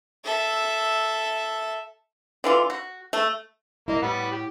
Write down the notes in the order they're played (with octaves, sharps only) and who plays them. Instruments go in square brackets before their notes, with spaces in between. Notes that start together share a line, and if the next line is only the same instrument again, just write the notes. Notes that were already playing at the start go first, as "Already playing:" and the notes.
[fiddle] A4 E5
[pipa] D3 E3 F4
F#4
A3
[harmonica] A#3 [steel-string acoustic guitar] E4 D#5
[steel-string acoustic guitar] A2 [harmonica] G3 B3 F#5
[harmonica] G4